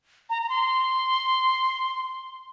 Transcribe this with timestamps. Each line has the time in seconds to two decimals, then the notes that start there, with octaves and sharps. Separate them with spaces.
0.30 A#5
0.42 A#5
0.49 C6